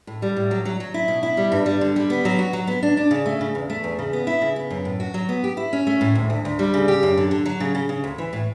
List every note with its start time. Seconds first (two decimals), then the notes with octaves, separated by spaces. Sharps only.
0.07 A2
0.22 G3
0.36 A2
0.51 F#3
0.65 F#3
0.80 F#3
0.94 E4
1.08 B2
1.23 E4
1.37 G3
1.52 G2
1.66 G3
1.81 D3
1.96 G3
2.10 B3
2.25 F#3
2.39 F#4
2.53 F#3
2.67 B3
2.83 D4
2.97 D4
3.11 C#3
3.26 A3
3.41 C#3
3.55 E2
3.70 A3
3.84 E2
3.99 C#3
4.13 B3
4.27 E4
4.42 C#3
4.56 B3
4.70 F#2
4.85 A2
5.00 F#4
5.14 F#3
5.29 B3
5.44 G4
5.57 E4
5.73 C#4
5.87 A3
6.01 A2
6.15 D2
6.30 D2
6.45 D2
6.59 G3
6.74 C#3
6.88 G4
7.03 F#2
7.17 D3
7.31 D3
7.46 F#3
7.60 C#3
7.75 C#3
7.89 C#3
8.04 D2
8.18 E3
8.33 A2